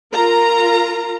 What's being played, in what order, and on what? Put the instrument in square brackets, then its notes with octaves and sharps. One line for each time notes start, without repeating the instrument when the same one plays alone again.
[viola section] F4 A#4 A#5